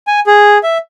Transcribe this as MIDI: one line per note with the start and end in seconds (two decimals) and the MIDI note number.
0.07 0.20 80
0.27 0.58 68
0.63 0.78 76